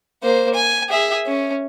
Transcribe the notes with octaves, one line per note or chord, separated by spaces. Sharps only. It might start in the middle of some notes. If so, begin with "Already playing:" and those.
A#3 C5
G#5
G#4 E5
C#4